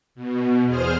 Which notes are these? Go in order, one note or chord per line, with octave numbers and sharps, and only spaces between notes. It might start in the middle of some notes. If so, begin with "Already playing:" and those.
B2
E2 G#4 C5 F6